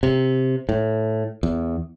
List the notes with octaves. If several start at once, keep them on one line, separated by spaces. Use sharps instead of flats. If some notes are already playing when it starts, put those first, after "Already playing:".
C3
A2
E2